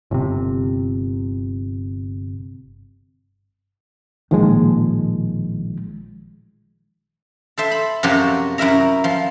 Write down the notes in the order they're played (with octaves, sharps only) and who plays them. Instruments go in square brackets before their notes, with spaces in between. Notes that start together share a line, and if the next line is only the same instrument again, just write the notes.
[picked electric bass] G1 C3
[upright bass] A1 A#2 [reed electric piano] D#3 F3 G#3
[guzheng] A4 C5 E5
B5
F#2 C3 F3 F#4 G4 C#5
F#2 E4 A#4 E5 A#5
F3